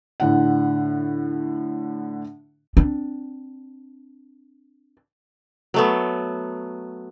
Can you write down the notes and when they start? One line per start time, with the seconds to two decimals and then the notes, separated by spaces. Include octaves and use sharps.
0.20 A2 D3 F#5
2.77 C4 D4
5.74 F#3 A3 B3